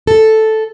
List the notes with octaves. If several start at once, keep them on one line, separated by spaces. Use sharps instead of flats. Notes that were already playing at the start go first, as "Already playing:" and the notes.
A4